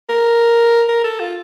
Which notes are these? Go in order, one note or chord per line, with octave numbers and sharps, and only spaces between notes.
A#4
A#4
A4
F4